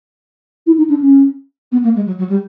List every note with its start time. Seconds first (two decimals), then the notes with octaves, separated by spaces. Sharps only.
0.66 E4
0.77 D#4
0.89 D4
1.01 C#4
1.72 B3
1.84 A#3
1.95 G#3
2.06 F#3
2.18 F#3
2.29 G3